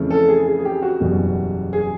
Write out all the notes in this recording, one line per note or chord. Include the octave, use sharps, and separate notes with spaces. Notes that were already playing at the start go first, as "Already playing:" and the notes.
Already playing: F2 C#3 E3 A3
A4
G#4
G#4
G#4
G4
F#4
F#1 E2 B2 G3
G#4